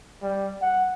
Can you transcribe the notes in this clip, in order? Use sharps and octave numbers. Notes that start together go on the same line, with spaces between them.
G3
F#5